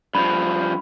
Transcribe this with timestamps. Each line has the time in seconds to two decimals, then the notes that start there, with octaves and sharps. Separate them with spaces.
0.15 G2 F3 B5